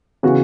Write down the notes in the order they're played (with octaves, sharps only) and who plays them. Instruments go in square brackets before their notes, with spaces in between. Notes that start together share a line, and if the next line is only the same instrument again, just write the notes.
[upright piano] C#3 E3 B3 F#4